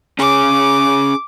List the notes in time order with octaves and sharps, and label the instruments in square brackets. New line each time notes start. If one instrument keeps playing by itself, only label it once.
[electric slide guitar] C#4 G#4 [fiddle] D6